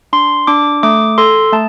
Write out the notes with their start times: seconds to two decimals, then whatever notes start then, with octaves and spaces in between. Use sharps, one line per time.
0.13 D4 C6
0.47 D4 D6
0.83 A3 D6
1.18 A4 C6
1.53 A3 A5